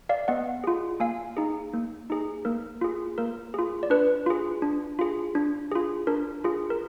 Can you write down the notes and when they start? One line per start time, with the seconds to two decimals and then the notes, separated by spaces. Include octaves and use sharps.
0.09 D5 F5
0.28 B3 D#5 F#5
0.64 F4 G#4
1.00 A#3 F5 G#5
1.37 D#4 G#4
1.74 A#3
2.10 D#4 G#4
2.45 A#3 A#4
2.81 F4 G#4
3.18 A#3 A#4
3.54 F4 G#4
3.83 D5
3.90 D4 B4
4.26 F4 G#4
4.62 D4
4.99 F4 G#4
5.35 D4
5.72 F4 G#4
6.07 D4 A#4
6.44 F4 G#4
6.70 A#4